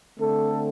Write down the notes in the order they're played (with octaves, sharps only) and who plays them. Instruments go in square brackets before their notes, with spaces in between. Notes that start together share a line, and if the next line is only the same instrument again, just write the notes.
[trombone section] D3 A3 C4 A4